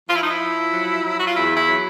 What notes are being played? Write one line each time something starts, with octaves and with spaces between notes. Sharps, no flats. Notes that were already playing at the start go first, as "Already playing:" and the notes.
F3 F4
E4
D#4
E4
F3
F#3
F#3
F#4
F4
E2 E4
E4
F#3